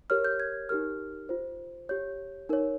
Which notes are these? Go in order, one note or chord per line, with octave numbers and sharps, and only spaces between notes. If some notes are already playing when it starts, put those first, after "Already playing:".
G4 A#4 C#5 F6
G6
G#6
D#4 G4 A#4 F6
F4 C5
G4 C#5 G6
D#4 A#4 C#5